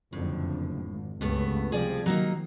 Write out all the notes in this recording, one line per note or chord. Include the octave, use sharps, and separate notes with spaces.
F#1 F2 A2 D3
G#1
C#2 G2 C#3 A3 B3
C3 F3 G3 G#4 D5
D#3 F#3 A#3 D#4